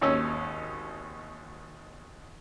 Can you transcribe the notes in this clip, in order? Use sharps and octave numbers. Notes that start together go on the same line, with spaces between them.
G#1 D#2 C#4 E6